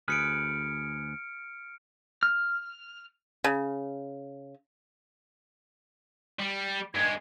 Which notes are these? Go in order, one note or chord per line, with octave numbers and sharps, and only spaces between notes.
D2 G#4 B4 F6 C#7 D7
F6
C#3
G3
G2 G#3 G#6